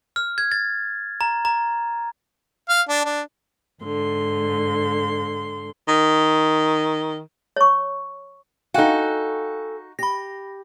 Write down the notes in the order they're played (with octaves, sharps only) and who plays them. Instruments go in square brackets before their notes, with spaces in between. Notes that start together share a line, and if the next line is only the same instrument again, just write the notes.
[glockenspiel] F6
G#6
A6
A#5
A#5
[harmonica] F5
D4
D4
[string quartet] G#2 D3 C6
[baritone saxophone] D#3
[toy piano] C#5 C#6
[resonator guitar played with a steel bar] D#4 F#4 [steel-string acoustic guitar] A4 G#5 [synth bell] F5 G5 F#6
[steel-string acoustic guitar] G4 [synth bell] B5 A#6